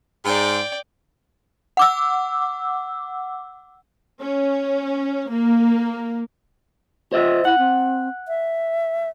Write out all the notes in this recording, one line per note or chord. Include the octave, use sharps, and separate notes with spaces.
G#2 D5 G5
F#5 D6 E6
C#4
A#3
F4 C5 D#5 E5
E4 F#5
C4
E5